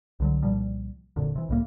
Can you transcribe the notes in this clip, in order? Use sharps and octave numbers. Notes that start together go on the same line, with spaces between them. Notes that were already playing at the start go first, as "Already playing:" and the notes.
C2 D3 F#3
C2 A#2 F3 G3
F#1 F2 A#2 D3
C3 E3
C2 A2 A#3